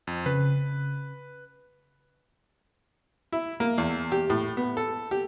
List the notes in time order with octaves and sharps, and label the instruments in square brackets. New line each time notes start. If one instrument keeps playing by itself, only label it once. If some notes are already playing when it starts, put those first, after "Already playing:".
[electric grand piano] F2
[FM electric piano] C#3 [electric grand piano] B4
[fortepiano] E4
A#3
E2
G4
A2
B3
A4
G4